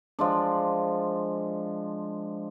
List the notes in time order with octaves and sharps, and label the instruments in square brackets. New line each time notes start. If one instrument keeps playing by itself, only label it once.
[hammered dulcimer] F3 G#3 D4